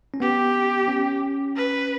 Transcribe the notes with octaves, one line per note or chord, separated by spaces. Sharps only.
C#4
B3 G4
C#4
B4